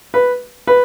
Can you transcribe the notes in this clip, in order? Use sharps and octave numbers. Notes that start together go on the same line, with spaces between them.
B4
B4